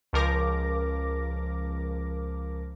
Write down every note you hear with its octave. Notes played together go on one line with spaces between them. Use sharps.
C#2 F3 A#4 D6 A#6